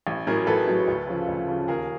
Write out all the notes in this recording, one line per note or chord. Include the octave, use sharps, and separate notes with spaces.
A1
A2 F#3 G#4 A#4
A1 A4 B4
A2 F#3
D2
C#3 F3
D2
C#3 F3
D#2 G#4 A#4